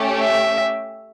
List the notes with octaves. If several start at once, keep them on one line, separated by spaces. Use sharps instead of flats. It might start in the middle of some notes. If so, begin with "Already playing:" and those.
Already playing: A3 C#4 G4
E5